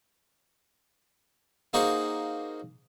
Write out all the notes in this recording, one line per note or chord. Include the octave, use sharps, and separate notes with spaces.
A#3 D#4 F#4 G#4 C5